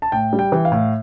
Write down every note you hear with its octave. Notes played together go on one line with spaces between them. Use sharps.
A5
A2 G5
G3
G5
E3
F5
A2